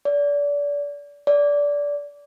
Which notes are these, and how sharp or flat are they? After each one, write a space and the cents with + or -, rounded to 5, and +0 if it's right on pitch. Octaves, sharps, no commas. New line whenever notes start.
D5 -30
D5 -20